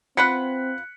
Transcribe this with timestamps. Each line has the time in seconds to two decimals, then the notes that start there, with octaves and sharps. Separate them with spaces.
0.17 C4 F4 B4 F#5 F#6 B6 C#7